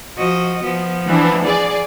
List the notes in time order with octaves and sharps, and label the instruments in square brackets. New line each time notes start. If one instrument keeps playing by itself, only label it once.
[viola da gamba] F3 F#4 D#5
F3 B3
[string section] E3 D4
G#4 D5